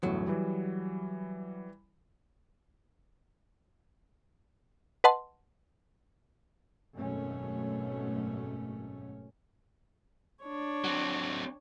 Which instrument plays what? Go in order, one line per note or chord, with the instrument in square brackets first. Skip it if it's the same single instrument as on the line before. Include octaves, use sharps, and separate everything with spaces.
[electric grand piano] G1 E2 A2 [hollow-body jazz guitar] F#3
[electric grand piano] E3 G3
[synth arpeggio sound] B4 D#5 F#5 A5 C6
[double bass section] G#1 F#2 B2 A3 C#4
[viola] D4 C#5
[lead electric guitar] F#3 C4